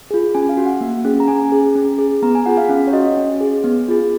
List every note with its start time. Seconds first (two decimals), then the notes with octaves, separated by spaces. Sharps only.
0.11 F4 G#4
0.35 C#4 G#5
0.49 F5
0.57 F#4
0.66 F#5
0.81 A#3
1.05 C#4 G#4
1.20 A#5
1.28 C#4 G#5
1.52 G#4
1.75 C#4
1.99 G#4
2.22 B3 A#5
2.35 G#5
2.46 F4 G#4 F#5
2.57 F5
2.69 C#4 F5
2.87 C#5
2.93 F#4 D#5
3.17 C#4
3.41 G#4
3.64 B3
3.88 F4 G#4